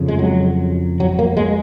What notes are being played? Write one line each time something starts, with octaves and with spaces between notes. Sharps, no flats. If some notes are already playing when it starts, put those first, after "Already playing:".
Already playing: F2 C#3
G#3
F#3
F#3
A#3
G#3